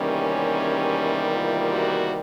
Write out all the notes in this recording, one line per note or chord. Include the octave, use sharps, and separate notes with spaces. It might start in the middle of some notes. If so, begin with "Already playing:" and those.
Already playing: E2 C3 D#3 G3 A#3 C#4
F4
F#4